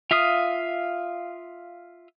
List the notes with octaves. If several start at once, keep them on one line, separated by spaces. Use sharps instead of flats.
F4 E5 F5 D#6